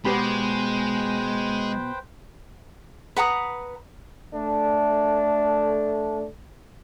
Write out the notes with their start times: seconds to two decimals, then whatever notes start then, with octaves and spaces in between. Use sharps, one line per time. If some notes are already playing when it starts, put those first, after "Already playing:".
0.05 B2 G#3 B3 G4 B4 C5 G5 B5
3.17 B4 F#5 A#5 D#6
4.34 A3 D4